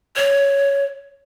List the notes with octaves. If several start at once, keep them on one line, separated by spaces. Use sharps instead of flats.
C#5